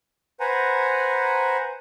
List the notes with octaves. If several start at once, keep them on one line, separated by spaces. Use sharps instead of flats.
B4 C5 F#5 G#5 A#5